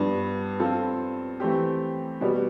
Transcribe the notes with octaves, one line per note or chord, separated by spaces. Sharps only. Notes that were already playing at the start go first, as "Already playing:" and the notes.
Already playing: G2 F3 B3 D4
F3 C4 F4 A4
E3 A3 C4 G4
B2 G3 B3